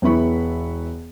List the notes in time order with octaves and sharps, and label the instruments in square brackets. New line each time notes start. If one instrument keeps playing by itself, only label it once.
[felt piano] E1 B3 E4 B5 C#6